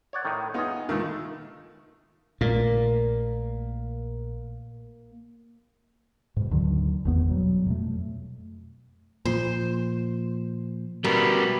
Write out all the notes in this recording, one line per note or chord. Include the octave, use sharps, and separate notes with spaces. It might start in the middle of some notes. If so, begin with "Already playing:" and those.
C#5 D5 F#5
A2 D#3
B3 D#4 F4 G#4
C#2 A#2 D#3 A3
A#1 A#2 A3 A#3
G#2 B2
D2 D3 D#3 F#3
G#1 E2 B3
B2 F#3 G3
F2 B2 A3
A#2 F3 C5
B2 G3 A#4